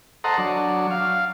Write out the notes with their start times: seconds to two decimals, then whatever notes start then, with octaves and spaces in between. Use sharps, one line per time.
0.24 A4 C5 D#5 F#5 A#5
0.38 F#3 D4
0.91 F5